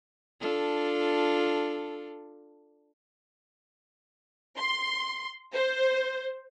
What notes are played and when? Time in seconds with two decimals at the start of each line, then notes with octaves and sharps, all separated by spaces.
0.40 D4 F4 A4
4.57 C6
5.53 C5